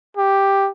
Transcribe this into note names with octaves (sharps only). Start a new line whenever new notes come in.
G4